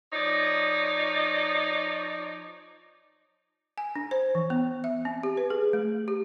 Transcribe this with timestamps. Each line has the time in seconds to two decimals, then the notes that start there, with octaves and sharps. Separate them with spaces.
0.13 F3 D#4 C#5 D5
3.78 G#5
3.96 D4
4.11 C5
4.35 E3
4.50 B3
4.84 E5
5.05 C4
5.23 G4
5.37 B4
5.50 G#4
5.73 A3
6.08 G4